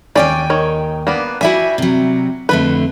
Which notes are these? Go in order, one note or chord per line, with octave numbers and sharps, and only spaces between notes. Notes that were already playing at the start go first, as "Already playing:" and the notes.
D#2 C#4 D5 F5 G5 G#5
D#3 C#5
A#3 B3 D4
G3 E4 F#4 E5 G#5
C3 F#3
F2 D3 A3 B4